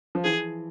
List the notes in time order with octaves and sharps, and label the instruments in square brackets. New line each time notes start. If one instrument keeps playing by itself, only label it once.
[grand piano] F3
[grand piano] E3 [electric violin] G#4